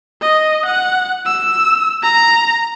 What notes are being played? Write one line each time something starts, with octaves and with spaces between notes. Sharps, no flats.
D#5
F#5
E6
A#5